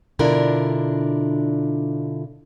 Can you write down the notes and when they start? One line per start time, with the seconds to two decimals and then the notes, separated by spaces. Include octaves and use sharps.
0.19 B2 D3 D4 E4 F4 A#4